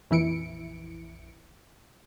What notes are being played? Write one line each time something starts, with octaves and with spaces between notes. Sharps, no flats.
A#1 F2 E3 E4 C#7 D7